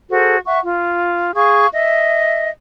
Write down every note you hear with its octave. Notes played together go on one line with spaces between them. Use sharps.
F#4 G#4 A4 C5
E5 F#5 C#6
F4
G#4 F5 C#6
D#5 E5